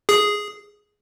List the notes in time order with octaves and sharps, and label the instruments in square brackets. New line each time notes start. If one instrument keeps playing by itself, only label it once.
[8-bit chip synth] G#4